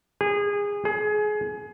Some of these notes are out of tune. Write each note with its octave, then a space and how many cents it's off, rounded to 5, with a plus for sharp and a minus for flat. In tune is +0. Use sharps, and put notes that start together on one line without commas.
G#4 -25
G#4 +25